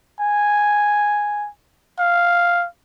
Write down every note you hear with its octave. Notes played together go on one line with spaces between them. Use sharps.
G#5
F5